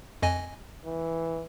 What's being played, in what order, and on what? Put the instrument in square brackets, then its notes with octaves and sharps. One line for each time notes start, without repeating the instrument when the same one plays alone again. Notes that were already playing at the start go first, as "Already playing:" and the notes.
[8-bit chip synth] F2 D#5 G#5
[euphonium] E3